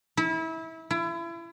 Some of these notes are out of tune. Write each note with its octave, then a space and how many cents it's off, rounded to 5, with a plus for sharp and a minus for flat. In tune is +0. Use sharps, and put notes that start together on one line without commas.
E4 -25
E4 +35